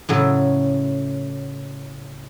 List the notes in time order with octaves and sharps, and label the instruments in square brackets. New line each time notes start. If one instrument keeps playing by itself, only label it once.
[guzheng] A2 C#3 F#3